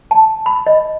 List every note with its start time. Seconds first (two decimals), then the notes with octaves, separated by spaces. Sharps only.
0.11 A5
0.46 B5
0.66 D#5